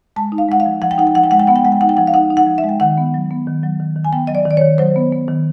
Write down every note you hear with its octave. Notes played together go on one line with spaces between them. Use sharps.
G#3 A5
D#4
F5
G#3 F#5
F5
F3
F3 F#5
G5
D#4 F#5
G5
F3 F#5
G5
G#3 F#5
G5
B3 F#5
G5
G#3 F#5
G5
D#4 F#5
G5
F3 F#5
F5
D#4 F#5
D#4
F#5
F3
E5
G#3
G5
D#3 F#5
B3
F#3
B3
D#3
F#3
D#3
D#3
G#5
B3 G5
F#3 D#5
D5
D#3
D5
D#3 C#5
F#3 C5
B3
B3
D#3